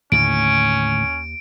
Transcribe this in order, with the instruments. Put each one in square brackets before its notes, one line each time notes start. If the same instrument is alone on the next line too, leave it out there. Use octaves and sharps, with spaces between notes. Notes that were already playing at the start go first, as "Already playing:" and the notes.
[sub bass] D#2 [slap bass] A2 D3 D#3 [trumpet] C#4 [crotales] D7